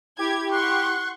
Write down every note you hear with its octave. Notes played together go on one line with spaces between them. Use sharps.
E4 G4 G#6
F#5 C6 C#6 F#6